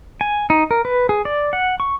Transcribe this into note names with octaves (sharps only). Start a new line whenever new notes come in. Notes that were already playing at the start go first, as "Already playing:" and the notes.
G#5
D#4
A#4
B4
G#4
D5
F#5
C#6